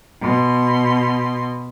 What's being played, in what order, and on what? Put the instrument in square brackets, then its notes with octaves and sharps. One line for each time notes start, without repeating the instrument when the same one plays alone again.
[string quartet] B2 C6